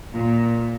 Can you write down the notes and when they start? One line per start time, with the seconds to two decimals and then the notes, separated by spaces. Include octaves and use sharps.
0.14 A#2